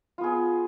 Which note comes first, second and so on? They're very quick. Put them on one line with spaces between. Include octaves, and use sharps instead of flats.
F4 B3 G#4